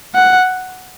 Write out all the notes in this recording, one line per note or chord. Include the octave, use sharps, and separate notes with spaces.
F#5